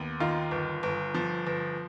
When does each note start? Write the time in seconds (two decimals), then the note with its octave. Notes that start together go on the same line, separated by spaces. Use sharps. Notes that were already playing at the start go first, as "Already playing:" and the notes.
Already playing: D#2 B3
0.20 D#3 F4
0.51 G1
0.83 G1
1.14 F3
1.47 G1